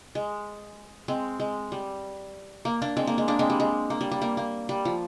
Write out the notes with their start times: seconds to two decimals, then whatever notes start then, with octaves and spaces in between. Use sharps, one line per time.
0.15 G#3
1.08 G#3 C4
1.40 G#3
1.72 G3
2.65 A#3
2.82 A#3 D4
2.97 G#3 C4
3.07 A#3
3.18 G#3
3.28 A#3 D4
3.39 G#3 C4
3.50 G3
3.60 G#3
3.90 A#3
4.01 G3
4.12 G3
4.22 A#3
4.37 A#3
4.69 G3
4.85 F3